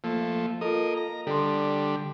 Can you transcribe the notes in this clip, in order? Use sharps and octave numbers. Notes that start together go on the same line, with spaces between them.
F3 A3 A#3
A#3 F4 A4 D#5
A#5
D3 G3 A4 C6